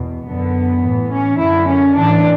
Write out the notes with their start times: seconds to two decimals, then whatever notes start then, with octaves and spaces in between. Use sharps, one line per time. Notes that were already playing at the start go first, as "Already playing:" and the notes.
Already playing: E2 B2
0.26 F#2 D3 B3
0.82 A2 E3
1.11 C#4
1.39 F#2 D3 E4
1.68 C#4
1.95 A2 E3 D4